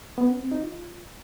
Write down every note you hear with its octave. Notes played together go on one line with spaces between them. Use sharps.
B3
C#4
C4
D#4
F4